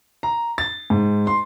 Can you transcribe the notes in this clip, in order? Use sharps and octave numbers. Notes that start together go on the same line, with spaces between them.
A#5
A6
G#2
C6